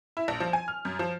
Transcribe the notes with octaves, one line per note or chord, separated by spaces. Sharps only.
E4
A#1
F3
G#5
F6
F#2
F3